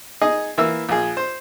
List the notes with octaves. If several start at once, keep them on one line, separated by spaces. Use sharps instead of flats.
D#4 G#4 D#5
E3 A#3 E5 E6
A#1 G#4
C5